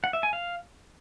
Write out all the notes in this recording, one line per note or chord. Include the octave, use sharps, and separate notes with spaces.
F#5
E5
G#5
F5